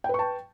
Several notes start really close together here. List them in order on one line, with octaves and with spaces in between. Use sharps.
G5 B4 C#6 A5